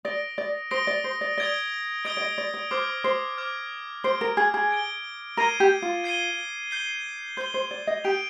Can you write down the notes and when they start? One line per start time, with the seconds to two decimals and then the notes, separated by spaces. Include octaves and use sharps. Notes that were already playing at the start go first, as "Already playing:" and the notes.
0.05 D5 D#6 A#6 D7 G7
0.38 D5
0.71 C5 D#6 A#6 D7 G7
0.87 D5
1.04 C5
1.21 D5
1.37 D5 D#6 G#6 D7 G7
2.04 D#5 D#6 G#6 D7 G7
2.17 D5
2.21 D#5
2.38 D5
2.54 D5
2.71 C5 D6 F6 G#6
3.04 C5
3.38 D6 F6 G#6
4.04 C5 G#6 D7 G7
4.21 A#4
4.37 G#4
4.54 G#4
4.71 G#6 D7 G7
5.37 A#4 G#6 C7 D#7 G7
5.60 G4
5.82 F4
6.04 G#6 C7 D#7 G7
6.71 G6 C7 G7
7.37 C5 G6 C7 G7
7.54 C5
7.71 D5
7.87 D#5
8.04 G4 D#6 G6 D7 F7